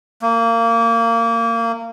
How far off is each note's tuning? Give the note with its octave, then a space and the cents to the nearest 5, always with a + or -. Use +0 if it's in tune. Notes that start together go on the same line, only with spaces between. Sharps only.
A#3 -20